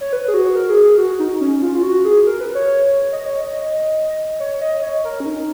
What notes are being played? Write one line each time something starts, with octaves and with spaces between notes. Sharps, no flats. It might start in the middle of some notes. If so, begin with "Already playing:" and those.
C#5
B4
G#4
F#4
A#4
G#4
G#4
F#4
D#4
C#4
F4
F4
F#4
G#4
A#4
B4
C#5
D#5
C#5
D#5
C#5
D#5
C#5
A#4
C#4
D#4